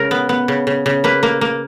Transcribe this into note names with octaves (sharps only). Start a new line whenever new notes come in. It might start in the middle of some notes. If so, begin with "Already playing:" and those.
Already playing: C#3 G#3 A#4
B3
B3
C#3
C#3
C#3
A#3 B4
A#3
A#3